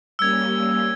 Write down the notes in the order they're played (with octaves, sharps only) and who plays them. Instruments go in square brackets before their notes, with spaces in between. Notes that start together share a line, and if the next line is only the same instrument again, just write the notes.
[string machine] G3 A#3 C#4 [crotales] E6 G#6